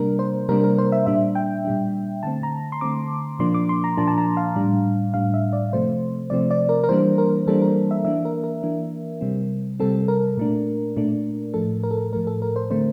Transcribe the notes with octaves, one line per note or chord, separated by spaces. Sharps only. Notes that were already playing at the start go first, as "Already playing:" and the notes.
Already playing: C3 G3 A#3 D4 A#4
C5
C3 G3 A#3 D4 A#4
A#4
C5
E5
A#2 G3 D4 E5
G5
A#2 G3 D4
D3 A3 C4 A5
A#5
C6
D3 A3 C4 D6
A#2 F3 A#3 D4 C6
D6
C6
A#5
A#2 F3 A#3 D4 A5
A5
A#5
F5
A2 G3 D4
A2 G3 D4 F5
E5
D5
C3 F3 A3 C4 C5
C3 F3 A3 C4 D5
D5
A#4
A#4
E3 G3 A#3 D4 C5
A#4
E3 G3 A#3 D4 A4
A#4
E5
E3 A#3 D4 E5
A#4
A#4
E3 A#3 D4
C3 G3 C4
C3 G3 C4 A4
A#4
A#2 A3 D4
A#2 A3 D4
A2 F3 A3 A4
A#4
A4
A#4
A2 F3 A3 A#4
A4
A#4
C5
D3 A3 C4 C5